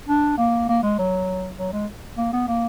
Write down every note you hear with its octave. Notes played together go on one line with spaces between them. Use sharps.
D4
A#3
A#3
G#3
F#3
F#3
G#3
A#3
B3
A#3